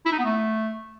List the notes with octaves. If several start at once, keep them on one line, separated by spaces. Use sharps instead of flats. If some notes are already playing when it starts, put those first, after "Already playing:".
E4
D#4
B3
A3